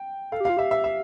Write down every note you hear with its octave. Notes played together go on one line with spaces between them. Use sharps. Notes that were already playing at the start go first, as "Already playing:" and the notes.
Already playing: G5
A4 F5
G4
F4 F5
G4 E5
E5
E5